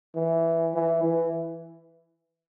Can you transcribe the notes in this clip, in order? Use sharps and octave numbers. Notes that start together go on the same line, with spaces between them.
E3
E3
E3